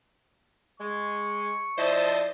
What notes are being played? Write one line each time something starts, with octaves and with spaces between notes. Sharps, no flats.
G#3 C#6
F3 E4 C5 D5 D#5 A5